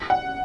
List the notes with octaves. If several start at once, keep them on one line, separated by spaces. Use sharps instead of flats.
F#5